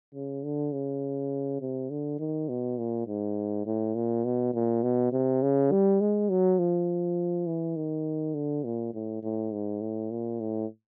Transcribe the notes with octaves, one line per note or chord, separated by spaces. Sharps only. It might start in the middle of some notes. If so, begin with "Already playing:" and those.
C#3
D3
C#3
C3
D3
D#3
B2
A#2
G#2
A2
A#2
B2
A#2
B2
C3
C#3
G3
G#3
F#3
F3
E3
D#3
D3
A#2
A2
A2
G#2
A2
A#2
A2